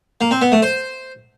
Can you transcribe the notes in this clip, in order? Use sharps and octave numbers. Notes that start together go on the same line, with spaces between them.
A#3
C4
B3
A3
C5